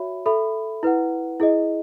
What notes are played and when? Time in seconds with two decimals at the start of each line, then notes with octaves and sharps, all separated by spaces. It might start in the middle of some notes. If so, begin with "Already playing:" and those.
Already playing: F#4 C#5 E5 B5
0.26 A4 E5 B5
0.83 E4 B4 F#5
1.40 E4 G#4 D#5